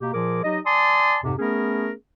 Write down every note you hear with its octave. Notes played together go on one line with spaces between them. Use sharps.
B2 A#3 G4
A#2 F3 G#4 A#4 D6
F#3 D#4 G4 D#5
D5 G#5 A5 C6 D#6
F2 G#2 C3
A3 B3 C#4 G#4 A#4